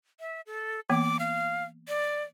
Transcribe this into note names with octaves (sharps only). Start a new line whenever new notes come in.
E5
A4
E3 A#3 B3 D6
F5
D5